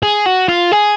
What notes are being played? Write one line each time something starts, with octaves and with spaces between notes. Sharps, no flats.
G#4
F#4
F4
G#4